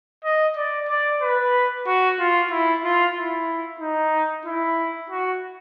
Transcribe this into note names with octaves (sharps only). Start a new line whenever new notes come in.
D#5
D5
D5
B4
F#4
F4
E4
F4
E4
D#4
E4
F#4